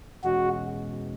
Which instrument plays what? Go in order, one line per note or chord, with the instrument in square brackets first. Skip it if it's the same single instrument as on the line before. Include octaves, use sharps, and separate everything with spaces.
[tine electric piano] E2 B2 G#3 C#4 [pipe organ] F#4